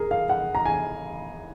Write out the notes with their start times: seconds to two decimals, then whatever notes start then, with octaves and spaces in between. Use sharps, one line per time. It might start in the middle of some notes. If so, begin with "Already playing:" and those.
Already playing: G#4 A#4
0.11 F5
0.29 F#5
0.55 A#5
0.66 G#5